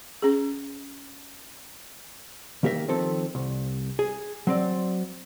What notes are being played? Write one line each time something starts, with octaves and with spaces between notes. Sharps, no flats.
C#4 G#4
D#3 A#3 G4 A#4 E5
D#3 F3 C4 A4
C2
G#4
F#3 C4 D5